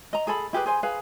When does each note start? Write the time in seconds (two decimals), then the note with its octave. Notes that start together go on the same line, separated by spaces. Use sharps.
0.13 D#5 A#5
0.27 G#4 A4 A5 B5
0.53 E4 G4 G#4 B4
0.66 G#4 C5 G#5
0.83 G#4 B4 F5